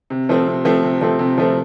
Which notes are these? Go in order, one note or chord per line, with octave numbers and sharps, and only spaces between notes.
C3
F3 A3 C4
C3
F3 A3 C4
C3
F3 A3 C4
C3
F3 A3 C4